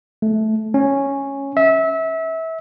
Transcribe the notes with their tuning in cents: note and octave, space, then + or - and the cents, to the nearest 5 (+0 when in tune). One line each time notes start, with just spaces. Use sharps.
A3 -15
C#4 -5
E5 -25